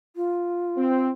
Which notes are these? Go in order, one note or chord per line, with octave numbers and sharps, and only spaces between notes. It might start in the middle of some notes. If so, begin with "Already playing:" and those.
F4
C4